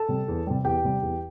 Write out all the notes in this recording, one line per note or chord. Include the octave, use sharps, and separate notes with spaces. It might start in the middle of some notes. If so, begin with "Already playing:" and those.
Already playing: A4 A5
C3 G3
E2
C3 G3
E2 G4 G5
C3 G3
E2